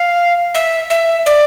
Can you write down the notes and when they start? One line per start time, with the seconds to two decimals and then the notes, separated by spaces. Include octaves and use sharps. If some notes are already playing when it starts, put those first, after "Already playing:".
Already playing: F5
0.54 E5
0.90 E5
1.26 D5